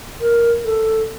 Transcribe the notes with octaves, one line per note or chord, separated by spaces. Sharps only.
A#4
A4